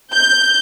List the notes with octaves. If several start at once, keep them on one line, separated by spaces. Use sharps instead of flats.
G6